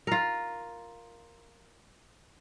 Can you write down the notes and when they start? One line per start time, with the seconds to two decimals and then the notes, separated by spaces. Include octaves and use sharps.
0.07 F4 A#4